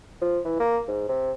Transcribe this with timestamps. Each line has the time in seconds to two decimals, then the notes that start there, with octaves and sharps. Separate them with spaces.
0.22 F3
0.45 E3
0.60 A#3
0.88 G#2
1.09 C3